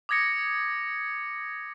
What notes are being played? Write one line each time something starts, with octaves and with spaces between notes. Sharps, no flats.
D6 D#6 G#6 A#6 C#7